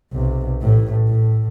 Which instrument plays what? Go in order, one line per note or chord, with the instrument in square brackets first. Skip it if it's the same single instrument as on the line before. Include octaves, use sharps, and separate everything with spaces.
[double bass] B1 C3
A1 A2
A2